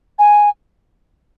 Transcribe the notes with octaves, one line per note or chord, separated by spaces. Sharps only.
G#5